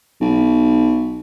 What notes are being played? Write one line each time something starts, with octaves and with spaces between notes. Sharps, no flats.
B1